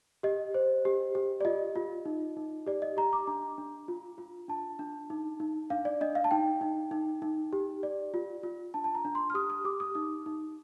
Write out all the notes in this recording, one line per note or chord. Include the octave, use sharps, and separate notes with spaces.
G4 D#5
C5
G4
G4
D5
F4 D#5
F4
D#4
D#4
G4 D5
D#5
G4 A#5
D6
D4 A#5
D4
F4
F4
D4 A5
D4
D#4
D#4
D4 F5
D5
D4 D#5
F5
A5
D#4 G5
D#4
D#4
D#4
G4
D5
F4
F4
D4 A5
A5
A#5
D4
C6
F6
G4 D#6
D#6
G4 D6
D#6
D#4 D#6
D#4